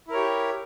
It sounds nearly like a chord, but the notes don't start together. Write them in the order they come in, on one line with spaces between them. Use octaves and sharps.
E4 A#4 C#5 G4